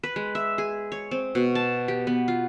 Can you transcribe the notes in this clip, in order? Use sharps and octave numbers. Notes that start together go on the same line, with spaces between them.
B4
G#3
E5
G#4
C#5
C4
B2
A5
G4
B3
F4